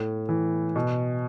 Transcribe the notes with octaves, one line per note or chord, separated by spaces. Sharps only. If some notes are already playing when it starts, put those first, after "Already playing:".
Already playing: A2
E3
B2